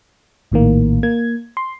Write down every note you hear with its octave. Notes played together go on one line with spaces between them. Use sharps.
A#1 A2 D#3 A#3
A#3 G#6
C6